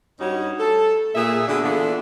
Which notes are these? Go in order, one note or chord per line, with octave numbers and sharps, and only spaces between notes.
G2 G3 C#4 D#4 F#4 C#5
A4
A#2 G#4 E5
D3 B3 D4 F#4 G#4
E3 B3 D4 F4 A4